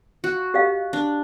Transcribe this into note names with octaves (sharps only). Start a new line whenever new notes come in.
F#4
G4 D#5 F5
D4